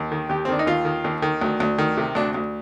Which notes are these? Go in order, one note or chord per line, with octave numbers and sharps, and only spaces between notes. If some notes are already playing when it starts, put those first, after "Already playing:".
Already playing: D#2
D#3
D#2 G4
C4
D#3 D4
D#4
D#2 F4
D#3
D#2
D#3
D2
D2
D#3
C3
D2 D4
D2